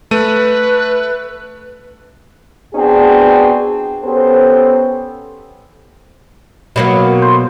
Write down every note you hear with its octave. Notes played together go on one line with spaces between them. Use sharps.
A3 B4 D#7
B3 C4 D4 F#4 G#4
B3 C#4 G4 A4 C5
B2 F#3 A#3
C5